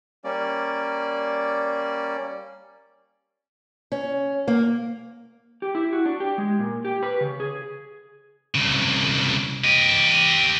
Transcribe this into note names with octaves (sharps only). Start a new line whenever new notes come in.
G3 A#3 C#4 D5
C#4
A#3
G4
E4
F#4
D4
G4
G#3
A#2
G4
B4
C#3
G#4
C2 C#3
G4 D#5